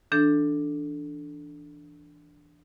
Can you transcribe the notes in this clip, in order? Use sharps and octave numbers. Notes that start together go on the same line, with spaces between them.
E3 D4 A4